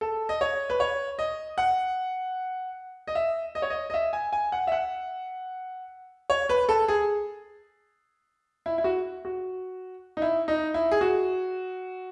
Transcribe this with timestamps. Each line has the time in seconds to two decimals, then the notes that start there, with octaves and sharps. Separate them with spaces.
0.01 A4
0.29 D#5
0.41 C#5
0.70 B4
0.80 C#5
1.19 D#5
1.58 F#5
3.07 D#5
3.15 E5
3.55 D#5
3.62 C#5
3.70 D#5
3.90 D#5
3.94 E5
4.13 G#5
4.33 G#5
4.52 F#5
4.67 E5
4.72 F#5
6.30 C#5
6.49 B4
6.69 A4
6.88 G#4
8.66 E4
8.78 E4
8.84 F#4
9.25 F#4
10.17 D#4
10.22 E4
10.48 D#4
10.74 E4
10.92 G#4
11.01 F#4